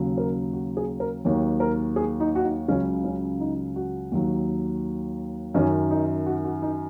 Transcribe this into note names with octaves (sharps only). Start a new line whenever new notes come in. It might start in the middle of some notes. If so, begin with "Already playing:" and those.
Already playing: D#2 C#3 F#3
A#4
F#4
G#4
A#4
D#2 D#3 F#3 C#5
A#4
G#4
D#4
F#4
D#4
C#2 C#3 F#3 C#4
C#4
D#4
F#4
D#2 D#3 F#3
F#2 D#3 F#3 C#4
D#4
F#4
F#4
D#4